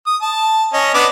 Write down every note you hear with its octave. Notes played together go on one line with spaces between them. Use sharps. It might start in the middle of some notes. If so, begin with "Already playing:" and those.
D#6
A5
C#4 D#5
B3 D4 D6